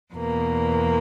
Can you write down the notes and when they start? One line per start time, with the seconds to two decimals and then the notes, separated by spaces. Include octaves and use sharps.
0.14 E2 B2 A#3